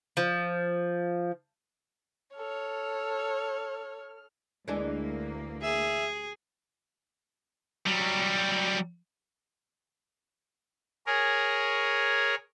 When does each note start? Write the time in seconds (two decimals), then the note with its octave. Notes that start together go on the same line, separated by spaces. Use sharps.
0.17 F3
2.36 A4 C#5 F6
4.68 D2 E3 G#3 A#3 D4
5.63 G#4 E5
7.86 F#3 G3
11.07 G#4 A#4 C#5